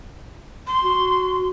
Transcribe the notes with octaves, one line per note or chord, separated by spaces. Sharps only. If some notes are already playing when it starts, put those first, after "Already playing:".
C6
F#4